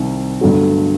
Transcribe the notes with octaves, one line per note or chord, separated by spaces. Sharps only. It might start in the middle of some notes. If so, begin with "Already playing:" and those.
Already playing: C2 C3 D#3
G1 G2 D3 F#3 A3